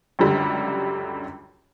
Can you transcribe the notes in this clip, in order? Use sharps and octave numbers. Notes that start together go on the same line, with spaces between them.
C#2 F#2 D3 G3